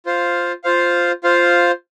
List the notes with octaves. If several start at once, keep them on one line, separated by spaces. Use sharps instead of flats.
F4 C5 F5
F4 C5 F5
F4 C5 F5